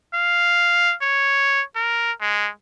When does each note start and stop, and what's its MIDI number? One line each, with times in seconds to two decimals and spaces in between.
0.14 0.95 77
1.02 1.62 73
1.76 2.12 70
2.21 2.50 56